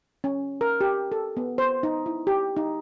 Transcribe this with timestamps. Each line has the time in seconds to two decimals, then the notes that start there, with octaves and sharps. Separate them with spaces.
0.24 C#4
0.61 A#4
0.81 G4
1.12 A4
1.37 B3
1.58 C5
1.83 D#4
2.06 E4
2.27 G4
2.56 D#4